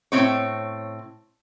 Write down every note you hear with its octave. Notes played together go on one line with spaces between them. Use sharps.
A2 C4 C#5